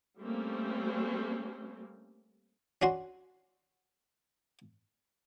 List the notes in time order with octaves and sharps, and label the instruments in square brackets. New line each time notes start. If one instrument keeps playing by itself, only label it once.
[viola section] G3 A3 A#3 C4 C#4
[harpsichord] C#4 D4 F#4 C6